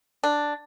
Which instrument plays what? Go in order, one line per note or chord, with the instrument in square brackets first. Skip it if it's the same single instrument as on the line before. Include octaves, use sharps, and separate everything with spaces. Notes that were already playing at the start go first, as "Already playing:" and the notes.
[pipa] D4